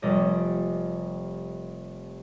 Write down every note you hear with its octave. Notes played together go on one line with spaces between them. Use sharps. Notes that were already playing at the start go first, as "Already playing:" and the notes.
F1 G3 D5 D#5